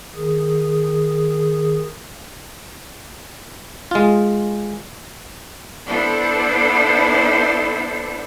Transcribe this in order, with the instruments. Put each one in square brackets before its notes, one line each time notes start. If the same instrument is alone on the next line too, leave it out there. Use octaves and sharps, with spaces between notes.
[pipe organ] D#3 G#4
[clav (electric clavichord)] G#3 F4
[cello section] B3 D4 E4 A4 C5